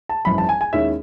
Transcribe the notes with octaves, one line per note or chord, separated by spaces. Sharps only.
A5
G#1 F#2 E3 B5
A5
G#5
G#5
D#2 D#3 G#3 C#4 E4 E5